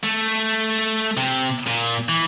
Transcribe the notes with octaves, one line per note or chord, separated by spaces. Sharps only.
A3
C3
A#2
E3